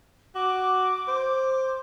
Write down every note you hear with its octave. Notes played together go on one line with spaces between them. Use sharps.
F#4 D6
C5